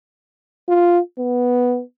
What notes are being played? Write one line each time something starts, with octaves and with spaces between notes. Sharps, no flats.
F4
B3